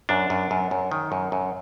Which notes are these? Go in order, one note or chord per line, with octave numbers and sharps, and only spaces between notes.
F#2 D4
F#2
F#2
F#2
D#3
F#2
F#2